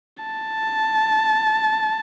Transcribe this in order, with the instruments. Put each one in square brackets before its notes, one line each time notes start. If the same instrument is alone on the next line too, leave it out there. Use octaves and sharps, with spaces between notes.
[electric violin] A5